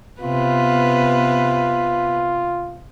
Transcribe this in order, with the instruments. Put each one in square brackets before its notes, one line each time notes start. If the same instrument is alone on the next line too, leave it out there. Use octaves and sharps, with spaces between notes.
[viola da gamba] C3 B3 B4 [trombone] F4